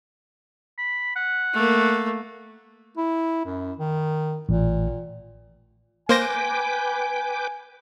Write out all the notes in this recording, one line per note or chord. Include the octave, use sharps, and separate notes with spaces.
B5
F#5
A3 A#3
E4
F#2
D#3
A1 A#2
A#3 B4 C5 G5 G#5 D6 A#6